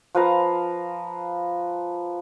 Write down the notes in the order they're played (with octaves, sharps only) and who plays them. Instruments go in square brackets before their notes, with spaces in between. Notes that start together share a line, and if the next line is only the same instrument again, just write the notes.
[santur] F3 B4 F5 A#5